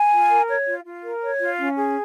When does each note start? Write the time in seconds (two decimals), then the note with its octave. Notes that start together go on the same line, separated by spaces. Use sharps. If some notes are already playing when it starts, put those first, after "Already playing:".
Already playing: G#5
0.12 F4
0.30 A#4
0.48 C#5
0.66 F4
0.85 F4
1.04 A#4
1.22 C#5
1.40 F4
1.59 C#4
1.77 G#4